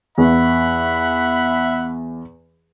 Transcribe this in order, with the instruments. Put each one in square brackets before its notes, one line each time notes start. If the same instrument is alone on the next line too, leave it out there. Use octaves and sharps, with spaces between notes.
[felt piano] E2 [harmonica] E5 F#5 B5